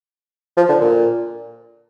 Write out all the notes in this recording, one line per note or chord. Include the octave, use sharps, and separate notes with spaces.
F3
D3
A#2